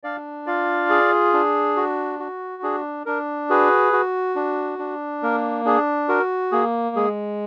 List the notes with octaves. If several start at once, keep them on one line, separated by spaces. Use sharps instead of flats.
D4 D5 F5
F4 D5 F5
G#4
D4
F#4
F#4
D4 G#4
D4 A#4
F#4 G#4 B4
F#4
D4
D4
A#3 A#4
D4 G#4
F#4 A#4
A#3 G#4
G#3 G#4